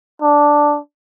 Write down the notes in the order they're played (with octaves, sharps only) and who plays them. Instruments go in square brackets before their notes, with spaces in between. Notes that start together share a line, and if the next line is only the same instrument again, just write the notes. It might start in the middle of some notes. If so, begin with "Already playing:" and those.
[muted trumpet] D4